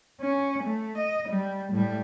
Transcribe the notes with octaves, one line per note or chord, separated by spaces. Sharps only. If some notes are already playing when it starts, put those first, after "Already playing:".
C#4
A3
D#5
G3
A2 G3